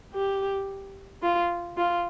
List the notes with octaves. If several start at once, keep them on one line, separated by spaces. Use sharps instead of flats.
G4
F4
F4